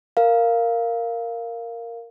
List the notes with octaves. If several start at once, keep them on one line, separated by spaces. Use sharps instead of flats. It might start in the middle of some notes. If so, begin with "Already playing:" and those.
A#4 F5